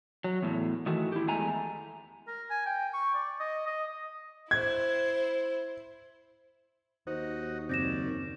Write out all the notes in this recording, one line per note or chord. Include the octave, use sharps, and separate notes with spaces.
F#3
E2 A2
D#3 E3 A3 F#4
E4 G4
E2 G#3 A3 G#5 A#5
A#4
G#5
G5
C#6
D5
D#5
D#5
E4 C5 G#6
D#2 D#4 F#4 C5
F#2 C#3 C4 D5 G6 A#6 E7